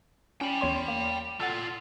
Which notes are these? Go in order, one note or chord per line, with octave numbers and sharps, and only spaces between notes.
C#4 G5 B5
E2 C#5 C6
A#3
F4 A4 D5 F#5